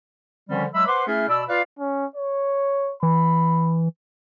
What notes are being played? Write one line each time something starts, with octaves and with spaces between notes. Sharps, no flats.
D3 D#3 F3 G3 C4 C#4
F#3 G#3 E5 B5 E6
B4 C5 F#5 C6 D6
A3 C#4 E4 G#4 E5 F6
B2 D5 B5 E6
F4 B4 D5 F5
C#4
C#5
E3 B5